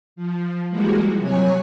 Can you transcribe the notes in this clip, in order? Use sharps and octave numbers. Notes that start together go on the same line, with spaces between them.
F3
E3 F3 G3 G#3 A#3 F#4
C3 F#3 C#5 G#5 F#6